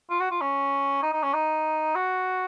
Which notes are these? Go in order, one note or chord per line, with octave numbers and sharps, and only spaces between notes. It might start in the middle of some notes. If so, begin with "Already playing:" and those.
F4
F#4
F4
C#4
D#4
D#4
C#4
D#4
F#4